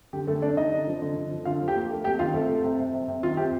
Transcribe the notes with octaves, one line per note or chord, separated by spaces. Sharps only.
D3 G4
D3 A3 A4
D3 D4 D5
D3 D#4 D#5
D3
F3
D3
D3
F3
D3 F4 F5
F3
G4 G5
A#3
A3
C3 G4 G5
D#3 F4 F5
C3 A3 A4
C3
C3
C3
C3
C3
D#3 F4
C3 G4